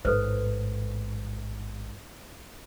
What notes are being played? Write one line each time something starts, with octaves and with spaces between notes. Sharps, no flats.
A1 G#2 A4 B4 C5